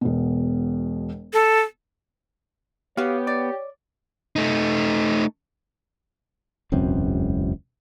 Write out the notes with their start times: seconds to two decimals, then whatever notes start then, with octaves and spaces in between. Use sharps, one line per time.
0.01 E1 B2
1.33 A4
2.97 B3 F#4 G4 C#5 F5
3.27 D5
4.36 A3 D#4
6.72 E1 C#2 F#2 C4